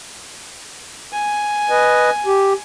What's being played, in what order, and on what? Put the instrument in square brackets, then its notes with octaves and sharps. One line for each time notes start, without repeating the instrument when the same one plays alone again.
[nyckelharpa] G#5
[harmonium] B4 D#5
G4